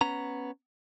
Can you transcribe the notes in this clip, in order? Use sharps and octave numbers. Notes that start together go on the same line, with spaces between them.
B3 C#4 A#5